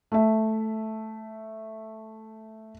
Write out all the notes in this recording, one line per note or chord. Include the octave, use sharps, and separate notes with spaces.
A3 E5